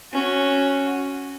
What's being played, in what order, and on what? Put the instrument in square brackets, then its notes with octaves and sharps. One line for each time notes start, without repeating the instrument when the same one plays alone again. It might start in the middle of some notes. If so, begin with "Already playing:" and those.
[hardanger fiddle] C#4 F#4